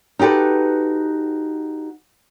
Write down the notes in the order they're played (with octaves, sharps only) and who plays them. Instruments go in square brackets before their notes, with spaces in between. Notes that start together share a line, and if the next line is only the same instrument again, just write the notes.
[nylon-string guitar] D#4 F#4 G4 A4 B4